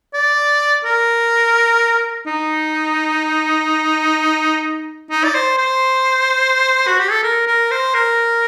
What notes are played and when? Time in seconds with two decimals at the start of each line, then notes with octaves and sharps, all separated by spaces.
0.14 D5
0.85 A#4
2.27 D#4
5.10 D#4
5.24 D5
5.35 C5
5.58 C5
6.87 F#4
7.00 G4
7.11 A4
7.23 A#4
7.47 A#4
7.71 C5
7.94 A#4